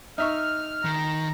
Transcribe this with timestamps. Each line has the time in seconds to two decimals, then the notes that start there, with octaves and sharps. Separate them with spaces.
0.18 D#4 E5 C#6 F6
0.85 D#3 A#5